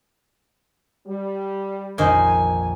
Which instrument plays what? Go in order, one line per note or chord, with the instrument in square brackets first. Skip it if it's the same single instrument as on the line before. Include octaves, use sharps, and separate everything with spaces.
[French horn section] G3
[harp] A#1 F2 D#3 [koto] A#3 D#4 C5 [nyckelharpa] G#5